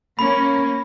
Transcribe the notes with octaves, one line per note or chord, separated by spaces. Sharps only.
A#3 C#4 B5